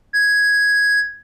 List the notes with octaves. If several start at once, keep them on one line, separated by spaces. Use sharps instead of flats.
G#6